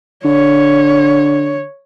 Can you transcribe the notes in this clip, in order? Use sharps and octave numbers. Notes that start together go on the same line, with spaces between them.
D3 C#5